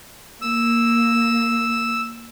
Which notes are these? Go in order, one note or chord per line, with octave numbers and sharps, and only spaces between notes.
A#3 E6